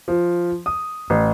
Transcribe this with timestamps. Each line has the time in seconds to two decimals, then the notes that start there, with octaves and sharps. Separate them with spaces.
0.08 F3
0.66 D#6
1.10 A1